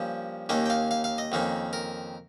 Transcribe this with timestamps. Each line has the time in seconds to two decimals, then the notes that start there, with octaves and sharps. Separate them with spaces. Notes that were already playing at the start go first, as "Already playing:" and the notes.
Already playing: G2 F3 A#3 C#4
0.49 D#2 D#3 A#3 C#4 D#5
0.66 G5
0.70 F5
0.91 F5
1.04 F5
1.18 D#5
1.32 F2 D#3 A#3 C#4
1.73 A#4